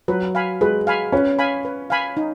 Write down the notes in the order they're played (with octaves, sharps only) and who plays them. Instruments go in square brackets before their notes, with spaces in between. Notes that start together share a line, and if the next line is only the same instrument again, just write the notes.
[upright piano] F#3 [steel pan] B4
[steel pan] F5 G#5 B5
[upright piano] G#3 [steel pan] B4
[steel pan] F5 G#5 B5
[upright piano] C#4 [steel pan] B4
[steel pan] F5 G#5 B5
B4
F5 G#5 B5
D#4